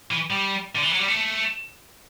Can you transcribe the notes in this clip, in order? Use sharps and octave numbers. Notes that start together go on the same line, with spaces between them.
E3
G3
D3
E3
F#3
G3
A3